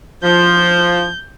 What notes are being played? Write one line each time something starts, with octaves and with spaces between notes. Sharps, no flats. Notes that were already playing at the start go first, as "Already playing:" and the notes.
F3 G6